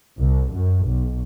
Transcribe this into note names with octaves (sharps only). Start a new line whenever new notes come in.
C2
F#2
B1